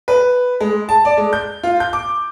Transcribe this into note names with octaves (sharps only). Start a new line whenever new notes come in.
B4
G#3
A5
D5
G#3
G6
F4
G6
D6